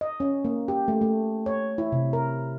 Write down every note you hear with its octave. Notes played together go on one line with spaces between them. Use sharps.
D#5
C#4
A#3
G4
A3
A3
C#5
E4
C3
A#4